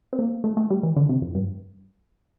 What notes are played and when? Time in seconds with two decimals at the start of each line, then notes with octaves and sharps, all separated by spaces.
0.13 C4
0.19 A#3
0.44 A3
0.57 A3
0.70 G3
0.83 E3
0.96 D3
1.09 C3
1.22 F2
1.35 G2